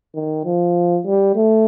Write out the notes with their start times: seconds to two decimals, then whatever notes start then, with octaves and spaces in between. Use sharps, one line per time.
0.15 D#3
0.45 F3
1.06 G3
1.35 A3